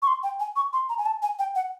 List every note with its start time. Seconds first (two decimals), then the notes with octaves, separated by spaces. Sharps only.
0.02 C#6
0.07 C6
0.23 G5
0.40 G#5
0.56 C#6
0.73 C6
0.89 A#5
0.98 G#5
1.06 A5
1.22 G#5
1.39 G5
1.55 F#5